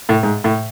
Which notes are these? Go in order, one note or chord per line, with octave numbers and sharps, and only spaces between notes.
A2
G#2
A2